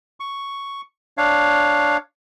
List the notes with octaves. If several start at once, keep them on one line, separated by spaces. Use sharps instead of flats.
C#6
D4 C#5 F5